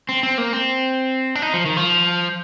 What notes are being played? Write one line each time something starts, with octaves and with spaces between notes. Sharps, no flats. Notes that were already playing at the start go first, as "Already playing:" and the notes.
C4
C4
A#3
C4
D4
D#4
F3
D#3
F3